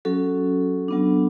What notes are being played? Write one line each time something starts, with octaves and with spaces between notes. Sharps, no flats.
F#3 C#4 F#4 A4
F#3 B3 D4